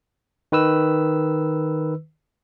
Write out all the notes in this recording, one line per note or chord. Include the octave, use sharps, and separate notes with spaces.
D#3 B4 E6